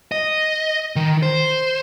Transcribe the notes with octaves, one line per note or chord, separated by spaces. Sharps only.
D#5
D#3
C5